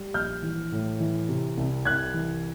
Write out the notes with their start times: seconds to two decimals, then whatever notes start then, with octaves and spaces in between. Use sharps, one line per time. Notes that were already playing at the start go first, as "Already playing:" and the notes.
Already playing: G3
0.14 A#1 F6 G6
0.43 E3
0.72 A2
1.00 E3
1.29 C3
1.57 C2
1.85 C2 F#6 G#6
2.14 E3